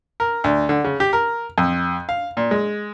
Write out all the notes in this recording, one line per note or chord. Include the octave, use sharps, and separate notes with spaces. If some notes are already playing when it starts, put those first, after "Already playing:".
A#4
D2
D3
C#3
G4
A#4
F2
F5
A#2
G#3